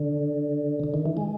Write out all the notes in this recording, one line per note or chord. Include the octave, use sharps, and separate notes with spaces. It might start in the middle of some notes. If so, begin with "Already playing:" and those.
Already playing: D3
D3
D#3
E3
G#3